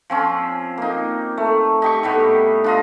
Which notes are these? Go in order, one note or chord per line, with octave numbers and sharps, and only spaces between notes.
F3 C4 C#4
A#3 D#4
A3
D#4 G4 C#6
A2 G3 B3
D4 F4 D#5